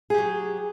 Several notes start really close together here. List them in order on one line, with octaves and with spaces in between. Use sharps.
G#4 G4 F#3